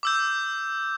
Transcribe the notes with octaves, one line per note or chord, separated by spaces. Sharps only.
D6 E6 G6